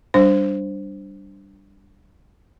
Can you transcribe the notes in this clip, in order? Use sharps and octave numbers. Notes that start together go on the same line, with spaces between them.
G3 D4 C5